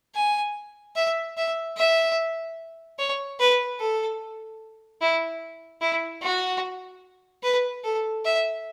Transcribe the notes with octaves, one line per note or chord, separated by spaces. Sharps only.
G#5
E5
E5
E5
C#5
B4
A4
E4
E4
F#4
B4
A4
E5